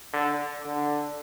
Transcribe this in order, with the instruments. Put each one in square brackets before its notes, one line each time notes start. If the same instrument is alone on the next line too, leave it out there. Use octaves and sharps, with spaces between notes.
[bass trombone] D3
D3